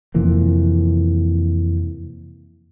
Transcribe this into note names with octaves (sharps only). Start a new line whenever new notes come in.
F2 C3 E3 A#3